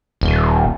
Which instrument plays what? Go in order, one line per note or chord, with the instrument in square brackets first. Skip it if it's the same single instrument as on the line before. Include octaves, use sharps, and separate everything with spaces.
[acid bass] D#1